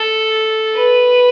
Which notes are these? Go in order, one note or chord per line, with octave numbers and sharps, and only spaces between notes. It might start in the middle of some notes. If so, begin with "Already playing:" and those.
Already playing: A4
B4